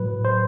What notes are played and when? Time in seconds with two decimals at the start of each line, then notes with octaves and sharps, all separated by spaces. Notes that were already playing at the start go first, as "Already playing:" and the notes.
Already playing: A2 F#3 B4
0.25 C5